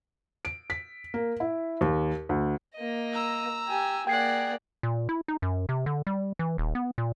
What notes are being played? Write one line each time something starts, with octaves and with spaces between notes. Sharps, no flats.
D7
B6
A#3
E4
D#2
D2
A#3 D#5
A#5 E6
G4 G#5
A#3 G#4 D5 F#5 G5 G#6 C7
A#2
E4
D#4
F#2
C3
D3
G3
E3
D#1
B3
A#2